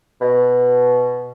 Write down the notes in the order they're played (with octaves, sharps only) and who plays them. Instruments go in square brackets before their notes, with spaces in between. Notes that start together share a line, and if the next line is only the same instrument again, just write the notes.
[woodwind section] B2